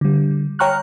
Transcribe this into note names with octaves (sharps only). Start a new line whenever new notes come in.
D3 G3
C#5 G5 A#5 C#6 F6 F#6